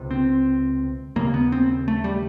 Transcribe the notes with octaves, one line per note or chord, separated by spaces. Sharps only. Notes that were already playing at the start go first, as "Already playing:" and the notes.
Already playing: C#2 C3
C4
D#2 C#3 A#3
B3
C4
A3
G3